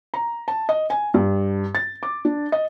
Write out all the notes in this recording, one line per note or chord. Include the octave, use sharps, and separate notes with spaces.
A#5
A5
D#5
G#5
G2
A6
D6
D4
D#5